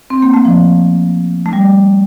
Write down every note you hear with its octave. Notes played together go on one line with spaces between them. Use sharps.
C4
A#3
A3
F3
A3
G3